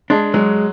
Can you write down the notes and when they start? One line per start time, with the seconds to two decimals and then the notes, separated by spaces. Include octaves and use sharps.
0.10 G#3 D4
0.34 F#3 G#3